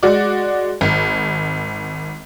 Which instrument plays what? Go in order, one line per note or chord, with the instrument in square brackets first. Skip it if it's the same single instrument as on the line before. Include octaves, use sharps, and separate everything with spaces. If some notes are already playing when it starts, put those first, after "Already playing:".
[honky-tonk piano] G#3 F#4 D5
G#1